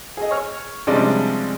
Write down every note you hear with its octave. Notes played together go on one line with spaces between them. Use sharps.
G#4 D#5
C#5 F6
C3 F3 G3 G#3 C#4 D4